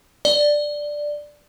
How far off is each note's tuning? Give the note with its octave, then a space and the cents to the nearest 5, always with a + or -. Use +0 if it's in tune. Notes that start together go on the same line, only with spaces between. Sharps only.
D5 +5